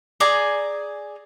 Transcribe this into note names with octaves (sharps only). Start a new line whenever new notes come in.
G#4 D5 G#5 A#5